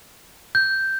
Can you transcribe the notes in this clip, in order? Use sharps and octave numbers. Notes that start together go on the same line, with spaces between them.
G6